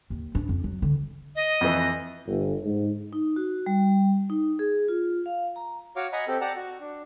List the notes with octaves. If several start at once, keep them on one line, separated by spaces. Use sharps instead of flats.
D#2
D4
F2
F#3
D3
D#5
F2 E3
G1
G#2
D#4
F#4
G3
D#4
G#4
F4
F5
A#5
F#4 C#5 F5 D6
D#5 F#5 G#5 A#5 B5
C4 G4 A4
G4 D5 F#5 A5 A#5
F#4
D4